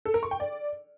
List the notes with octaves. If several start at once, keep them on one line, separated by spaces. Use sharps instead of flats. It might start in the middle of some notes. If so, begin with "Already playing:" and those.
A4
A#4
C#6
G5
D5